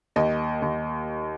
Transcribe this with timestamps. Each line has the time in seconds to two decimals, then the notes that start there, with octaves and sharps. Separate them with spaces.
0.16 D#2 D#5
0.62 D#2